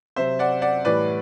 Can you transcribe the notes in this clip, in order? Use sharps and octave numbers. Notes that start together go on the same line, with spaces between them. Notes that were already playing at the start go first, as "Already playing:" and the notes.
C3 F#3 C5 E5
D5 F#5
D5 F#5
A2 E3 G3 B4 D5